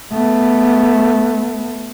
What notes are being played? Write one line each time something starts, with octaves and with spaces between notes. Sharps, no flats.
A3 B3